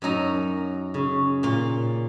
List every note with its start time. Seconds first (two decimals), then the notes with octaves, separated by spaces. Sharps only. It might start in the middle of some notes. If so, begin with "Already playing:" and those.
0.02 F#2 F#3 D#4 A#5
0.94 C#3
1.43 A#2 F4